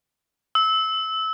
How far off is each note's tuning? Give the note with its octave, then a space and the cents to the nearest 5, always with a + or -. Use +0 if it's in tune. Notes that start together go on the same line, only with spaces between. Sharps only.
E6 -20